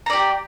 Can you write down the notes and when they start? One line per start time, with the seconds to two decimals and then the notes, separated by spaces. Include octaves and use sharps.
0.06 A#5
0.10 D5
0.13 G4